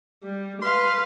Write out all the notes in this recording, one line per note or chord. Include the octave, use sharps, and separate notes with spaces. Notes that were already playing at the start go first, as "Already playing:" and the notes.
G3
B4 F5 C6